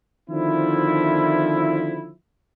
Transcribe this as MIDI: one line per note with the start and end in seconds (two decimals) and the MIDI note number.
0.30 2.11 50
0.30 2.11 51
0.30 2.11 53
0.30 2.11 60
0.30 2.11 64